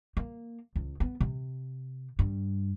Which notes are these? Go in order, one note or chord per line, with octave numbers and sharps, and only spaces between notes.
A#3
C#2
B3
C3
G2